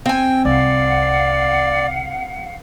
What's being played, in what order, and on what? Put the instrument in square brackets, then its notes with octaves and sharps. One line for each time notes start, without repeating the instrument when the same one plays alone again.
[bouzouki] C4 G#5 [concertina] G5
[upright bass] C2 [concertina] D5 [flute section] F5 F#5